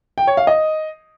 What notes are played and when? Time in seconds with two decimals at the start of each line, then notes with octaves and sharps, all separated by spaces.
0.18 G5
0.27 C#5
0.37 F5
0.47 D#5